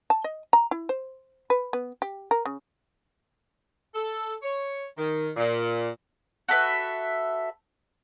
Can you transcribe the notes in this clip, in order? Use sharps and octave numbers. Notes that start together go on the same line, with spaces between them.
A5
D#5
A#5
E4
C5
B4
B3
G4
A#4
C#3
A4
C#5
D#3
A#2
F#4 A4 B4 E5